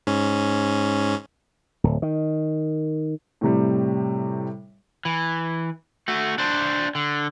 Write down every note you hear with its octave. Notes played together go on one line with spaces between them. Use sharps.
G#2 C#4
D1
D#3
A2 C3 G3
E3
A3 F#4
D4 C5
D3